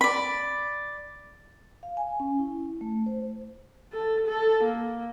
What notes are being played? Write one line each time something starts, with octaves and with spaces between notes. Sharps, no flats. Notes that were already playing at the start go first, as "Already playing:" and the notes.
D5 B5
F5
G#5
C#4
E4
A3
C5
A4
A4
A#3